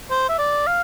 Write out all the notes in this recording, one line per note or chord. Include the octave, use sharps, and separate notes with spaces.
C5
E5
D5
F5